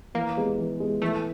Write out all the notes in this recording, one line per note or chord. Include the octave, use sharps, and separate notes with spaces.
E3 A#3
G#3 B3
E3
G#3 B3
E3 A3